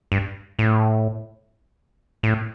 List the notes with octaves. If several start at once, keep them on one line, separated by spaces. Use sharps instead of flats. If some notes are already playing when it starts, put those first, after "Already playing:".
G2
A2
A2